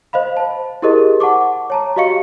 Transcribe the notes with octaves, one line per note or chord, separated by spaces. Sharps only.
C5 D#5 F5 B5
C5 A5
E4 G4 G#4 A#4 C5 D#5
F#5 A5 C#6 D6
C#5 A5 A#5
F#4 G4 D#5 F5 C#6 C#7